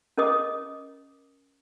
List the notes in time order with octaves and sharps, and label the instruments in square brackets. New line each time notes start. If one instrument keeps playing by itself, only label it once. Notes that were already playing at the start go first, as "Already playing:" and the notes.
[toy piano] C#4 A#4 D#5 D6 D#6